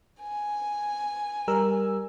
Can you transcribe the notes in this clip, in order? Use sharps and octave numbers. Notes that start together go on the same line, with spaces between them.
G#5
G3 A#4 E6